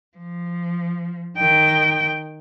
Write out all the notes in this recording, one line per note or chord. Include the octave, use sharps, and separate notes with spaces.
F3
D#3 G5